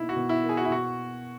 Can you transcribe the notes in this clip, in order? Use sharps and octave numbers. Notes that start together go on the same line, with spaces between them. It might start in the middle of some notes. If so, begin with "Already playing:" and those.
Already playing: B2 A#3 D#4 E4
F#4
B2
E4
A#4
G#4
F#4
E4
B2 F#4